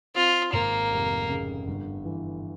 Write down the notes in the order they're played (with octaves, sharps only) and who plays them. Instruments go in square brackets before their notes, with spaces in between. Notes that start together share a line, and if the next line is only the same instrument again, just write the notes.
[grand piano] C4 [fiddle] F4
[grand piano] G#1 [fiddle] A#3
[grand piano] F1
C#3
G1
E3